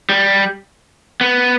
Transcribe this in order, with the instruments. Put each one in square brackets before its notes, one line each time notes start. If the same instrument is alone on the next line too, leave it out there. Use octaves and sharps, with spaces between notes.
[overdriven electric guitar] G3
B3